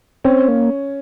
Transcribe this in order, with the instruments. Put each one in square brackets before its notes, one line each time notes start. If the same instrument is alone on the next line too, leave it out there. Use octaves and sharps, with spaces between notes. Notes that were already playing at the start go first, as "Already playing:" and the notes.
[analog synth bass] C4 [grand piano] C#4
[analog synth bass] A#3